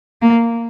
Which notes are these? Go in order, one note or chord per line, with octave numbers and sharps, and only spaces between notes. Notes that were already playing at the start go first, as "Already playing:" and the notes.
A#3